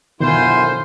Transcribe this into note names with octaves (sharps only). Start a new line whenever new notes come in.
F#2 B2 D3 D#3 E4 F4 C5 G#5